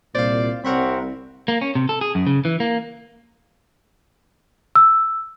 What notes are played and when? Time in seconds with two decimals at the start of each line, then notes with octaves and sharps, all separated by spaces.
0.15 C2 A#2 C5 D5 F5
0.65 C2 C4 A#4 C#5 F#5 B5
1.48 A#3
1.61 C#4
1.75 C3
1.89 A4
2.01 G#4
2.15 F#2
2.27 C#3
2.45 E3
2.60 A#3
4.75 E6